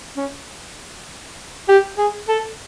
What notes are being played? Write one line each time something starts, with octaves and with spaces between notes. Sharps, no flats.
C#4
G4
G#4
A4